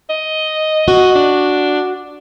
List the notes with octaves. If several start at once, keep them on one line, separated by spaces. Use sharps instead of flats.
D#5
F#4
D4